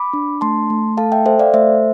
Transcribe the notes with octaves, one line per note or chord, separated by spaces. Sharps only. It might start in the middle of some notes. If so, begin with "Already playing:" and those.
Already playing: B5 D6
D4
A3 A5 C6
A3
A4 F5 A5
E5 G5
A4 C5 E5
D5 F5
A3 C5 E5